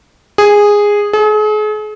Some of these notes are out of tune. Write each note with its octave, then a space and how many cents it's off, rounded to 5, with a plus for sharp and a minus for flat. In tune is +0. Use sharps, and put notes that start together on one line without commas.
G#4 -10
G#4 +40